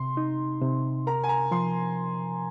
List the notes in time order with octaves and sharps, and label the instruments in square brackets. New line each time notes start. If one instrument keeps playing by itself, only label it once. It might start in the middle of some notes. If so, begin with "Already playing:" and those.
Already playing: [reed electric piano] C3 [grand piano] C6
[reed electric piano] D#4
C3
[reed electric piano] A#4 [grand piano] A#5
[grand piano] G#5
A#5
[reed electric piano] F3 [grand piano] C6